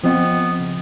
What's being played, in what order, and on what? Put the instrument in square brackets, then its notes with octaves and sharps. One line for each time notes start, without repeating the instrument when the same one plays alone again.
[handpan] F3 C4 D#5 [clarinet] B3
[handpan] C#3